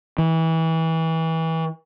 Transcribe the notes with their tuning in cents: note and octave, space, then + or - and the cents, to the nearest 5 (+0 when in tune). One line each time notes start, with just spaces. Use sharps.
E3 -25